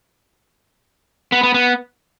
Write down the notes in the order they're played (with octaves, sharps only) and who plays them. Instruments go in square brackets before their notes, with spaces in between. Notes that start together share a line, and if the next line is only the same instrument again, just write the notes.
[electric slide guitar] B3
B3
B3